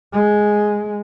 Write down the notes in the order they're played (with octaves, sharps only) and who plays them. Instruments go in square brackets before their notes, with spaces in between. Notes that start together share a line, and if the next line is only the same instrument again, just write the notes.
[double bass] G#3